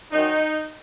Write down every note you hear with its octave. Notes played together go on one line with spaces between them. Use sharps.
F#2 D#3 F#3 D#4